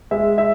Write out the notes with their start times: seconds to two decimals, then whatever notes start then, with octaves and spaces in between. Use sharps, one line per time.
0.11 G#3 E5
0.38 E5